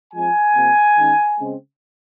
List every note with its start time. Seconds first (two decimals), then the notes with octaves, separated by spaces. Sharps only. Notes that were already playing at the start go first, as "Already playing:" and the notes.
0.13 F3 G#3 C4 G#5
0.55 C3 F3 A#3
0.96 D#3 G#3 C#4
1.39 C#3 G#3 C4